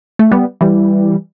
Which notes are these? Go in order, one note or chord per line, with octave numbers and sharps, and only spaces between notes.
A3
G3 B3
E3 G3